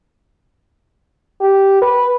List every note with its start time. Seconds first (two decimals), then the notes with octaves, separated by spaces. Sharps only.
1.41 G4
1.82 B4